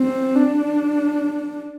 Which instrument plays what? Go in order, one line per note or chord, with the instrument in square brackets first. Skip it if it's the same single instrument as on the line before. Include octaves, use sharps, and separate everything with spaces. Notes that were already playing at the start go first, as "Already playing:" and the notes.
Already playing: [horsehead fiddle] C4
D4